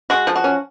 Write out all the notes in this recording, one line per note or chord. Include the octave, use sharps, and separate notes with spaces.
G#3 F#4
F3
F#4
C#4